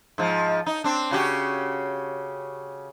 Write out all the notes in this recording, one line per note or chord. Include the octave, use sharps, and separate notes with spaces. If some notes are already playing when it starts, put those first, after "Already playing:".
G#2 F3
D#4
C4 D4
C#3 F#4 G4